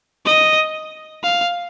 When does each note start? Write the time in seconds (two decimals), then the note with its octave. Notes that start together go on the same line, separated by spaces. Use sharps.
0.26 D#5
1.23 F5